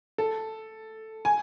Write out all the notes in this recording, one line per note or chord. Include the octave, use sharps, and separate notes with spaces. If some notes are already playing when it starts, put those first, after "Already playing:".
A4
G#5